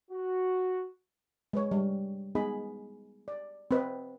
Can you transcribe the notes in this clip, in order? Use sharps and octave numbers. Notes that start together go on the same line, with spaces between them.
F#4
G#3 B4 C#5
G3
G#3 B3 D#4 G#4 D#5 B5
D5
C4 B4 D#5